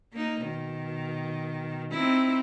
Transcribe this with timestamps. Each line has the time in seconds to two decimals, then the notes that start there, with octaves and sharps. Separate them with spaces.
0.13 A#3 D#4
0.42 B2 D#3
1.92 C4 D#4 E4